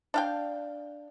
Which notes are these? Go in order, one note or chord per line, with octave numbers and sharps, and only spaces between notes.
D4 F5 G5